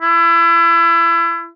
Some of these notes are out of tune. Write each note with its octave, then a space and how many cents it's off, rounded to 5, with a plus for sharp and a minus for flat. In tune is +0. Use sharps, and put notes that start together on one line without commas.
E4 +30